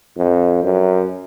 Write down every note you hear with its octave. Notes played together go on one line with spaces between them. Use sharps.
F2
F#2